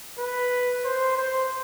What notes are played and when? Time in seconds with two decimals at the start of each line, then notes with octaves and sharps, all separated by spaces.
0.19 B4
0.84 C5
1.17 C5